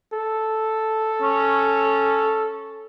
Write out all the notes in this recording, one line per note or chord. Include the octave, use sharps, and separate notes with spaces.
A4
C#4